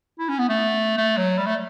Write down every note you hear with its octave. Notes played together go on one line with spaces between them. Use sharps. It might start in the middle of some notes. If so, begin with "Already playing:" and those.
E4
C#4
B3
A3
A3
F#3
G3
A3